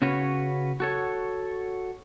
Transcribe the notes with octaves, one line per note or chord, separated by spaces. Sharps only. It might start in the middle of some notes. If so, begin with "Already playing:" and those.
C#3 C#4 F#4 B4 C#5
F#4 A4 C#5